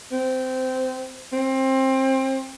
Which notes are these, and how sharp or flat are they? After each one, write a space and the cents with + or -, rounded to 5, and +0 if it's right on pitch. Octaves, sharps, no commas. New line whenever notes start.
C4 -15
C4 +25